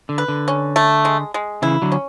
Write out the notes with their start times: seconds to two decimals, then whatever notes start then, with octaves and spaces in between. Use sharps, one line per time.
0.09 D3
0.18 B4
0.28 D3
0.48 C#4
0.76 A3
1.05 G#3
1.34 G#3
1.62 C#3 E3 E4
1.82 D3 F#3
1.92 C#4